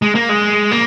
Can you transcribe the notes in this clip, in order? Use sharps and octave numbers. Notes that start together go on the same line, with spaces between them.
G#3
A#3
G#3
A#3